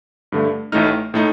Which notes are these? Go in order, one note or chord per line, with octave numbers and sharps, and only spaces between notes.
G2 D3 A3
A1 A2 A3 D#4 F6
A2 A3 D#4